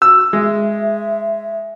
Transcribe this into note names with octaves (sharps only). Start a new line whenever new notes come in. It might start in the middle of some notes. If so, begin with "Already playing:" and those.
F#4 E6
G#3 E5